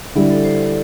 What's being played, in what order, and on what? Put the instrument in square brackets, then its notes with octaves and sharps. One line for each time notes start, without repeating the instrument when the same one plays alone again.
[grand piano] D3 G3 E4 [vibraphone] D5
[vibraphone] A4
C5
C5